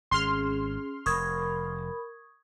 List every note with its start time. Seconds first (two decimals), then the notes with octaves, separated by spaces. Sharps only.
0.11 G#1 C#4 G#4 C6 F6
1.06 F1 A#4 B5 C#6 D#6 G#6